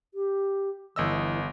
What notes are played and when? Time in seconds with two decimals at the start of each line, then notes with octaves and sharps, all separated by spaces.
0.14 G4
0.96 G1 E3 D#5 E6